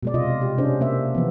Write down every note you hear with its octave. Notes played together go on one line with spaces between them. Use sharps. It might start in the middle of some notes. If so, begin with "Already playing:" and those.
B2 G#3 D5
C3 F4 D#5
G4
C3 C#4 D4 G#4 C5
A#3 C5 E5
E3 F3 B3